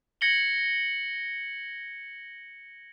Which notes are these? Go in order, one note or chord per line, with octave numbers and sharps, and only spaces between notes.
G#6 A#6 C#7 F#7 G7